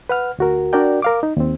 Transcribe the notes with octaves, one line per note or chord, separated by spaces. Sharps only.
B4 F#5 F6
D2 F#4 A#4
D4 F#4 A#4 D5 G5
A#4 F5 D6
D#4
D#2 C4